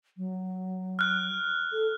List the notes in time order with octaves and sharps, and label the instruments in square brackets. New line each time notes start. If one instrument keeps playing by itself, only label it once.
[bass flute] F#3
[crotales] F6 F#6
[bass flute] A4